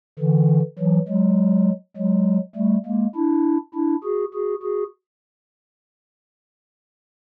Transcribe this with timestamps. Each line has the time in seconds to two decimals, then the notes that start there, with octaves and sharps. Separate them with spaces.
0.19 D3 E3
0.79 E3 F#3
1.09 F#3 G#3
1.97 F#3 G#3
2.56 G3 A3
2.86 G#3 A#3
3.15 D4 E4
3.74 D4 E4
4.04 F#4 G#4
4.34 F#4 G#4
4.63 F#4 G#4